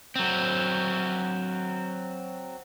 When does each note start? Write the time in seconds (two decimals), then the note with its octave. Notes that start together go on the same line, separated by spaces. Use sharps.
0.15 F#3 C4